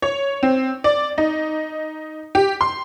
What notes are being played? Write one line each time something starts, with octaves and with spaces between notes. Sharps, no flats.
C#5
C4
D5
D#4
G4
C6